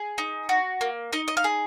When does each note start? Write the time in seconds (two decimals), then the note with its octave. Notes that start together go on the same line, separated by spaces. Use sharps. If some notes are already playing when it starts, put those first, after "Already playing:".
Already playing: G#4
0.18 D#4
0.49 F#4
0.81 A#3
1.13 D#4 D#5
1.28 D#5
1.37 F5
1.44 G#4